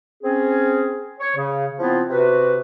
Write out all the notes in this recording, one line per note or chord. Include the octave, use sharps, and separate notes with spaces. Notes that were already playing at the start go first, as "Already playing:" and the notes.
C4 C#4 G#4
C#5
C#3
F3 B3 C4 E4 F4
C3 F#4 B4